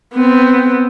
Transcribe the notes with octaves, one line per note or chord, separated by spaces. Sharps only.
B3 C4